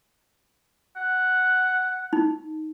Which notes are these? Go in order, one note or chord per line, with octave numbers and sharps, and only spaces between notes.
F#5
D#4